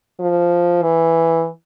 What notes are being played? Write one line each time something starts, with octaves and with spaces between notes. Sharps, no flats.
F3
E3